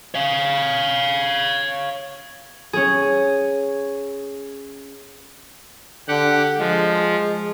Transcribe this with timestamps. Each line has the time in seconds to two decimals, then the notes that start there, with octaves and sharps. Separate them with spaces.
0.15 C#5 F5
2.73 C#4 G#4
6.08 D3 G4 F#5
6.59 F3 G#3